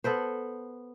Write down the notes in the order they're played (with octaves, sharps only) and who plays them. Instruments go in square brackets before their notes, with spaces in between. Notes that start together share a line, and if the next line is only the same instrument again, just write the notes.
[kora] B3 A4 B4 C5